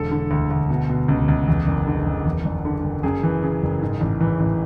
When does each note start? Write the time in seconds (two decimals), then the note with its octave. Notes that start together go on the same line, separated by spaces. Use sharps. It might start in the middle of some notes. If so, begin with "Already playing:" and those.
Already playing: E1 D3 A4
0.11 D3
0.31 D2
0.51 D2
0.70 B2
0.89 B2
1.08 C#2
1.28 C#2
1.48 E2
1.67 F#1
1.87 D3
2.06 F#1
2.25 E2
2.45 F#1
2.65 D3
2.84 F#1
3.03 F#2 G#4
3.23 E3
3.42 C#3
3.63 F#1
3.81 G#2
4.00 A1
4.20 E3
4.40 A1